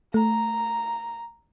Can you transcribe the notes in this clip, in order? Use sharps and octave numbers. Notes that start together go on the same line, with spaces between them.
A3 A#5